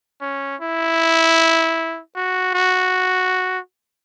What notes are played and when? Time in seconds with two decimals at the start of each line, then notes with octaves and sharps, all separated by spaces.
0.22 C#4
0.61 E4
2.16 F#4
2.55 F#4